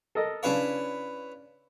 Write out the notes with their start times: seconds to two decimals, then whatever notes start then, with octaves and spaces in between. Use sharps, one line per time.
0.15 A4 A#4 D#5
0.43 C#3 D4 E4 B4 C#5 F5